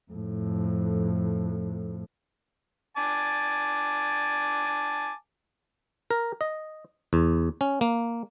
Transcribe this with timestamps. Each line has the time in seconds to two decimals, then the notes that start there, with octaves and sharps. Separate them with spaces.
0.12 F2 A2
2.97 G#5 A5 D6
6.11 A#4
6.41 D#5
7.13 E2
7.61 C#4
7.81 A#3